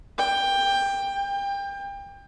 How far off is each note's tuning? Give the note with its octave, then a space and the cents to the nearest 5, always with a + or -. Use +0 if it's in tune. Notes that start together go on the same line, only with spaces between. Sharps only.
G5 +15
G5 +30